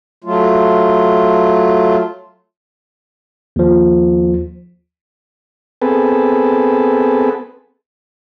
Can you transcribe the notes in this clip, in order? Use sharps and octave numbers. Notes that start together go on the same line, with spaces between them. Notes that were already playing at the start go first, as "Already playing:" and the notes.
F#3 A3 F4
D#2 F3
B3 C4 G#4 A4 B4